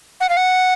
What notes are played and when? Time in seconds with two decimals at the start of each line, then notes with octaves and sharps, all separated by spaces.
0.20 F#5
0.29 F5
0.37 F#5